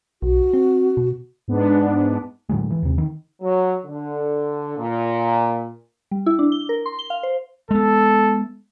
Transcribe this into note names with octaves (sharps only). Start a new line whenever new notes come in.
B1 F#4
C4
B2
G#2 B3 D4
A2 D3 F#3 G#3
E3
D#2 C3
D#3
F#3
D3
A#2
G3
E4
D4
G7
A#4
C6
G7
F5
C5
G#3 B3 A4